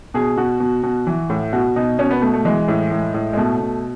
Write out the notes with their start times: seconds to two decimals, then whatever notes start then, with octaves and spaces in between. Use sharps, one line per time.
0.14 B2 G#4
0.38 B2 F#4
0.60 B2
0.83 B2
1.07 E3
1.30 A2
1.53 B2 F#4
1.76 B2 D#4
1.99 B2 C#4
2.11 B3
2.22 B2 A3
2.33 A3
2.45 E3 G#3
2.68 A2
2.91 A2
3.14 A2
3.33 G#3
3.37 B2 A3
3.60 B2